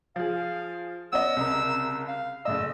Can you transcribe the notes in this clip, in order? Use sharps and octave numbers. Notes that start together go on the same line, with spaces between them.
F3 G#4 F5
B3 C#4 D#5 E6
C2 C#3 A#4
F5
F#1 A2 D#5 E6